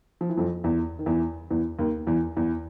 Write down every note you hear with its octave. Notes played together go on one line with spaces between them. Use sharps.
F3
E3
F2 F3
E2 E3
D#3
E2 E3
E2 E3
D#2 D#3
E2 E3
E2 E3